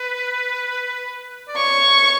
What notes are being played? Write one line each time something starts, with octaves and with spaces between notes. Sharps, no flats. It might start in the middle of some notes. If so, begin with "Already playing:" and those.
Already playing: B4
D5
C#5 C#6